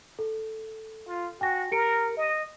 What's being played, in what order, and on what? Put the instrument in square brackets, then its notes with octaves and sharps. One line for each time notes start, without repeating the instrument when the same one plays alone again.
[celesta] A4
[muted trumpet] F4
[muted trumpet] F#4 [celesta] G5 G#5 A#6
[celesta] G4 C#7 D7 [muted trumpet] A#4
[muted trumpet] D#5